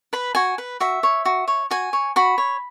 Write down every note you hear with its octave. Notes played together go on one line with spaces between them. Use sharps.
B4 B5
F#4 G#5
B4
F#4 E5
C#5
F#4
C#5
F#4 G#5
C#5
F#4 B5
C#5